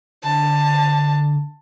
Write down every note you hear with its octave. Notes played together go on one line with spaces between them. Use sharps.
D3 A5